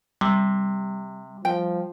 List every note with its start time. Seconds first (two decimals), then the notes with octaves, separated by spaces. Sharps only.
0.21 C3 G3
1.45 F3 G5